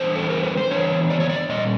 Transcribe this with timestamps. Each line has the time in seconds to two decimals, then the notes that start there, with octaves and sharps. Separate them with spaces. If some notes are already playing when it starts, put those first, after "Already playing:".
Already playing: E3 G3 B3 D4 C5
0.16 A4
0.30 A#4
0.43 B4
0.57 C5
0.71 E3 G3 B3 D4 C#5
1.10 D5
1.20 C#5
1.30 D5
1.49 A#2 G3 D#5